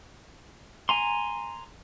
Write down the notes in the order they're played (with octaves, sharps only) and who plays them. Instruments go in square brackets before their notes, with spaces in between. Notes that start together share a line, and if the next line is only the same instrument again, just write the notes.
[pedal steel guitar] G#5 A#5 C6